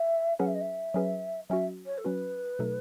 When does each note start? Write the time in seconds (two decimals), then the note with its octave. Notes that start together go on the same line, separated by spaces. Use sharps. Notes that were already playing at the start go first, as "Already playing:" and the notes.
Already playing: E5
0.39 F#3 C#4 G#4 B4 F#5
0.47 E5
0.54 D#5
0.61 E5
0.94 F#3 C#4 G#4 B4
1.49 F#3 C#4 F#4 E5
1.86 C#5
1.98 A4
2.05 F#3 C#4 F#4 B4
2.59 B2 F#3 A3 D#4 A4